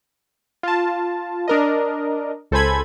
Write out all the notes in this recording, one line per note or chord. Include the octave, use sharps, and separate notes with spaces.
F4 A5
D4 A#4 D#5
C#2 A4 C5 G#5 B5 G#6